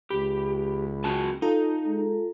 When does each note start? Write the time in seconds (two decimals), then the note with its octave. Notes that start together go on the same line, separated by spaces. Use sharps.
0.10 C#2 G4 B5
1.04 C#4 F#4 A5
1.42 D#4 F4 A4 A#5
1.87 G#3